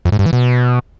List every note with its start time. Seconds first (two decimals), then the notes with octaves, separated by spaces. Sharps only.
0.05 F2
0.12 G#2
0.19 G2
0.26 E3
0.33 B2